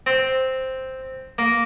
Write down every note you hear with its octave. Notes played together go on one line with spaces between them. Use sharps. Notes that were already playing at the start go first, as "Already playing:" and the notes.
C4
A#3